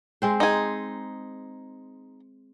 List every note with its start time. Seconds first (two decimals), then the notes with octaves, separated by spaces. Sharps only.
0.22 G#3 C4 C5
0.40 D#4 G#4